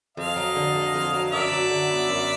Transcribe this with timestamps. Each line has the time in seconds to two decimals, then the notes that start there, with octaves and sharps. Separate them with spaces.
0.17 F2 D#5 F5
0.36 F#3
0.56 D3
0.75 A3
0.95 F2
1.13 F#3
1.32 F#2 D5 E5
1.52 F#3
1.71 D3
1.90 B3
2.09 F#2